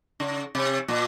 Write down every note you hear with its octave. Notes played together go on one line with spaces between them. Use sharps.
C#3
C3
A#2